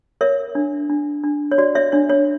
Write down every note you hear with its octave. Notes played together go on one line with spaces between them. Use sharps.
A#4 C#5 E5
D4
D4
D4
C#5
F#4 D5
C#5 E5
D4 C#5
C#5